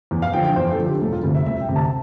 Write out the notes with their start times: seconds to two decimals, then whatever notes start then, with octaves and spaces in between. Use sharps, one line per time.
0.11 E2
0.22 F5
0.33 D3 F3 G5
0.45 G5
0.56 E2 C5
0.71 A4
0.78 D3 F3
0.86 G4
1.01 E1 A4
1.13 F4
1.24 D2 C3
1.35 E5
1.46 E1 E5
1.61 G5
1.69 D2 C3
1.76 A5